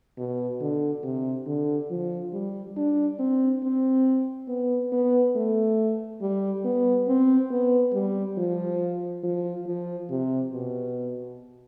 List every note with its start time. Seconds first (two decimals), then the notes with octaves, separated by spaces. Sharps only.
0.18 B2
0.61 D3
1.04 C3
1.47 D3
1.90 F3
2.33 G3
2.77 D4
3.19 C4
3.63 C4
4.48 B3
4.92 B3
5.36 A3
6.22 G3
6.65 B3
7.08 C4
7.51 B3
7.94 G3
8.38 F3
9.23 F3
9.67 F3
10.10 C3
10.52 B2